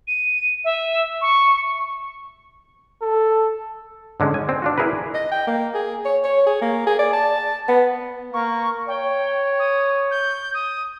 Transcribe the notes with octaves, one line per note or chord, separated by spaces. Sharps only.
D#7
E5
C#6
A4
G#2 D3 G#3 C#4
G#5
C4
D4 F4 F#4
E4 G#4 A#4 B4
D#5
G5
A#3
G#4
C#5
C#5
G#4
A#3
G#4
D5
A5
B3
A#3 C#6
C#5 G5
D#6
G6
D#6